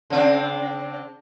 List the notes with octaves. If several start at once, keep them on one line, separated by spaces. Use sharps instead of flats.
C#3 C4 D4